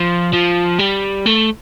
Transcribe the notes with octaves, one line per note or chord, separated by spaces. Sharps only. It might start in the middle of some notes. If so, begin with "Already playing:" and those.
Already playing: F3
F3
G3
A3